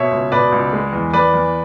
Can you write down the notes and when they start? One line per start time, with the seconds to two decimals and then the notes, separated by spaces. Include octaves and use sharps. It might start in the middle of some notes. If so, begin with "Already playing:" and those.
Already playing: B2 C#5 E5
0.11 C#2
0.32 B2 B4 D5
0.52 C#2
0.73 G#3
0.93 E2
1.13 E2 B4 D5
1.34 E2